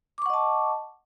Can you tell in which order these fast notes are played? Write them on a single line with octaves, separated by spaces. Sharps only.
D6 C#6 F#5 D#5 A5